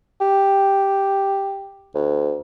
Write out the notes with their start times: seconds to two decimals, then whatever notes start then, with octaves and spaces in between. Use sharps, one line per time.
0.21 G4
1.95 D2